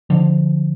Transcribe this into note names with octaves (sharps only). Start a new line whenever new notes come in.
D3 F3